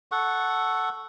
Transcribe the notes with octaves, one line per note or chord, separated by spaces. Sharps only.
A4 F#5 C#6